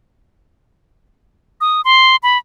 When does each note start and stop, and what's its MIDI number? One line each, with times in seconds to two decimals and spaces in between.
1.61 1.81 87
1.85 2.16 84
2.23 2.38 83